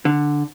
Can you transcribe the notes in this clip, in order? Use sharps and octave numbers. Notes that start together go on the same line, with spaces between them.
D3